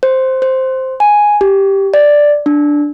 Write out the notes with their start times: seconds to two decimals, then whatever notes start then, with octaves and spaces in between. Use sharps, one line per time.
0.03 C5
0.42 C5
1.00 G#5
1.41 G4
1.94 D5
2.46 D4